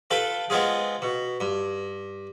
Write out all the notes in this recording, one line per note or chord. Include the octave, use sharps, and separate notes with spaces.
F4 A4 B4 G5
G#3 B3 C4 F4 G#4
B2
G2